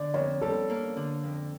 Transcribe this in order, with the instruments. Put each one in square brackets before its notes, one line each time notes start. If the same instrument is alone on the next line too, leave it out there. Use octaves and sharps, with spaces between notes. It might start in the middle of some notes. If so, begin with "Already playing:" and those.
Already playing: [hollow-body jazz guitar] D3 [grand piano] D5
[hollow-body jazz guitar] F2 [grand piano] C#5
[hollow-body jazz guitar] G3 [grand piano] A4
[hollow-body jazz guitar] A#3
D3
F2